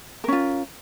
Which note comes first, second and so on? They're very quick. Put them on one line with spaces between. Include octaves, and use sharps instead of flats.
A#4 C#4 F4